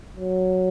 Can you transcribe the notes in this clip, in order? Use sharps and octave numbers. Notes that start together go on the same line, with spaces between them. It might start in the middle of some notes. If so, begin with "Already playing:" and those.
F#3